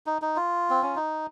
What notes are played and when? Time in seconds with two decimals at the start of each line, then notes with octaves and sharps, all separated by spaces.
0.06 D#4
0.22 D#4
0.36 F4
0.70 C4
0.83 C#4
0.96 D#4